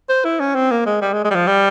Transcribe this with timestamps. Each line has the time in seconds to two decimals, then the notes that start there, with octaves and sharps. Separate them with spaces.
0.09 C5
0.24 E4
0.40 C#4
0.55 C4
0.71 A#3
0.86 G#3
1.01 G3
1.13 G#3
1.24 G#3
1.30 G3
1.35 F3
1.47 G3